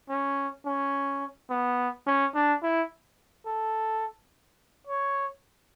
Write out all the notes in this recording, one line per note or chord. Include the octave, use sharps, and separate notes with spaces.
C#4
C#4
B3
C#4
D4
E4
A4
C#5